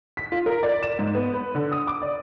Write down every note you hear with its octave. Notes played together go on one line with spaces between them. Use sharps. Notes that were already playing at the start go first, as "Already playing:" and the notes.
B6
F4
A#4
D5
E7
G#2
B3
B4
D3
D#6
D6
D5